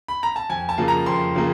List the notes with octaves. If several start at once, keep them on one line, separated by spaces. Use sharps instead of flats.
B5
A#5
A5
F2 G#5
A5
C#3 F3 A#3
A#5
F2 C6
C#3 F3 A#3